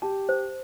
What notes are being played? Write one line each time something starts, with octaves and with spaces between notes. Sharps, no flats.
G4 A5
C5